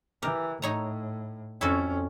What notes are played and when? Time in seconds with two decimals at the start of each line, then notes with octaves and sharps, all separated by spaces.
0.22 E3 G4 A#4
0.62 A2 D#4 C#5 A#5
1.61 F2 C#4 E4 F#4 A4